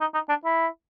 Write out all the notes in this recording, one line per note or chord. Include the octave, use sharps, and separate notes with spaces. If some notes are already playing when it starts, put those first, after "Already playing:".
D#4
D#4
D4
E4